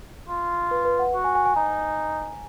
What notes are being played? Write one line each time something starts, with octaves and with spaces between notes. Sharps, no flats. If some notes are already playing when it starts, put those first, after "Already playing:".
F4
B4
B4
F#5
F#4
G#5
G#5
G#5
D#4 A#5